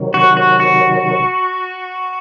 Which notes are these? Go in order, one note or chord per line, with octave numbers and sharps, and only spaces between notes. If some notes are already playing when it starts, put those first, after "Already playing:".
Already playing: C3 D#3 F#3
F#4
F#4
F#4